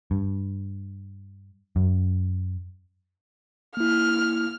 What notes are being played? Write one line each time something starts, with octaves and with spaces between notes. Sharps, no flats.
G2
F#2
A#3 E4 F6